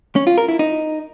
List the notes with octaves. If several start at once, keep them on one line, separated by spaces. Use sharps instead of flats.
C#4
F4
A#4
E4
D#4